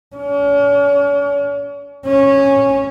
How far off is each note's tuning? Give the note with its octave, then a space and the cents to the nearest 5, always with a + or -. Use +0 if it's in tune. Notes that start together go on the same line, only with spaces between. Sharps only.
C#4 +45
C#4 -10